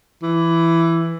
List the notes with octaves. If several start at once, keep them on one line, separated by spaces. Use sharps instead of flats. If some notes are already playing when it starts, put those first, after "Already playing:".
E3